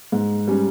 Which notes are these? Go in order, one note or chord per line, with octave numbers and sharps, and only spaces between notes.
G#2
G3 C#4